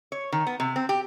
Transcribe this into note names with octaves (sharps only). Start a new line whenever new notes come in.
C#5
D#3
B3
C3
C4
G4